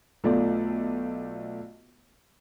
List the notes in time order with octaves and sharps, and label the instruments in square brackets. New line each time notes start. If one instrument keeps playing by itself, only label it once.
[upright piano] B1 A3 F4 D5